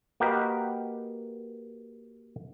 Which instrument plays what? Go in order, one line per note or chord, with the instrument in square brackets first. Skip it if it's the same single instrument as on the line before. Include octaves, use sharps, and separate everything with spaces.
[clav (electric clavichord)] A#3 F#4 G4 A#4 B4 D#5